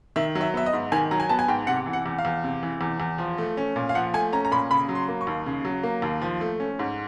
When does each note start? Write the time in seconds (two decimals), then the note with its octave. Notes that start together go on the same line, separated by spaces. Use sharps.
0.16 D#3 E5
0.35 F#3
0.41 E5
0.54 B3 E5
0.66 D#5
0.73 G#2
0.92 D#3 G#5
1.11 F#3 A#5
1.20 G#5
1.29 B3 A5
1.39 G#5
1.48 G#2 G5
1.67 C3 F#5
1.86 E3
1.93 F#5
2.06 E2
2.18 F5
2.25 E2
2.44 C3
2.63 E3
2.81 E2
3.00 E2
3.18 F3
3.38 A3
3.57 C#4
3.76 A#2
3.89 F5
3.95 F3 F#5
4.14 A3 G#5
4.33 C#4 A#5
4.45 A#5
4.51 A#2 B5
4.71 C#3 B5
4.89 F#3
4.95 C6
5.08 A#3
5.21 C#6
5.27 D#2
5.46 C#3
5.65 F#3
5.83 A#3
6.02 D#2
6.22 F3
6.41 A3
6.60 C#4
6.79 G#2